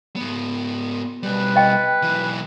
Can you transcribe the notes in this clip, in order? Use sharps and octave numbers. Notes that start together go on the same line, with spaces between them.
G#2 B3
B2 G3 B4
D#5 G5
B1 E3